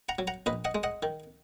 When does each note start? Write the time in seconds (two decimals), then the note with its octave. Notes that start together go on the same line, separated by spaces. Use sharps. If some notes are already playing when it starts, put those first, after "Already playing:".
0.09 F#5 A#5
0.19 F#3
0.27 F#5 A#5
0.46 A#1 B4 D#5
0.65 D#5 F#5
0.75 G#3
0.83 D#5 F#5
1.03 D#3